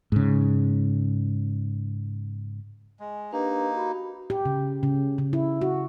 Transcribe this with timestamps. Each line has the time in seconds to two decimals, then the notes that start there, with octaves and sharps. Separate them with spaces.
0.12 G#2 C#3
3.00 G#3
3.32 A#3 D4 D#4 G4 B4
3.74 F#4 B5
4.30 G4
4.45 C#3
4.83 C#3
5.18 C#3
5.33 E4
5.61 F#4